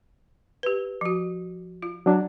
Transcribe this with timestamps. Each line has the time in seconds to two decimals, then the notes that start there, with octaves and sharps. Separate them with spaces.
0.63 G4 B4
1.01 F3 F#4
1.82 F4
2.06 F#3 D4